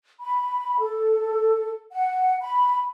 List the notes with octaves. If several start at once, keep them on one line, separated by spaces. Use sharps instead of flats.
B5
A4
F#5
B5